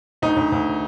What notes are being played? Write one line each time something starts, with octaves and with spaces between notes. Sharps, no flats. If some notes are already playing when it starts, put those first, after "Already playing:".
D2 D#4
D2
D2